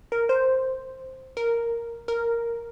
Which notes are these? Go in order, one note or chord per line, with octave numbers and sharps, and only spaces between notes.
A#4
C5
A#4
A#4